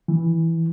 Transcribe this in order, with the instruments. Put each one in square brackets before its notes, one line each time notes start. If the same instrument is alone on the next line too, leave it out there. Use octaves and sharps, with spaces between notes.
[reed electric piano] E3